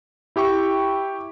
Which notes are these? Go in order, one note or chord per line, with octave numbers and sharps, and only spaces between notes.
E4 G4 G5 C#6